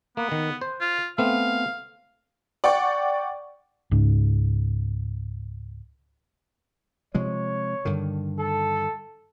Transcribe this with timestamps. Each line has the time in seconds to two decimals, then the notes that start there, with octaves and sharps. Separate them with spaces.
0.17 A#3 B3
0.32 D#3
0.61 C5
0.81 F4
1.18 A3 B3 C4 F5
2.64 D5 F#5 G5 C#6
3.91 C#2 G#2
7.15 C3 F3 G#3 C#5
7.85 G2 D3 D#3
8.39 A4